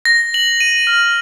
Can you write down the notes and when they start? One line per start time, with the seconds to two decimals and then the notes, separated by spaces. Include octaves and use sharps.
0.05 A#6
0.34 F#7
0.60 D#7
0.87 F6